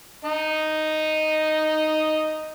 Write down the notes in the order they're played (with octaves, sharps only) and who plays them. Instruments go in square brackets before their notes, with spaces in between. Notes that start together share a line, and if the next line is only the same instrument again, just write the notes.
[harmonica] D#4 D#5